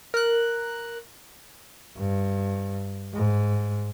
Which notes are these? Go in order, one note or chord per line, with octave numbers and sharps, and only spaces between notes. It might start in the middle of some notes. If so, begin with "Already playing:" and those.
A#4 F#6
G2
G#2